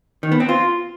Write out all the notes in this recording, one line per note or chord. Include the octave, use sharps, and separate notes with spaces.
D#3
B3
C4
F4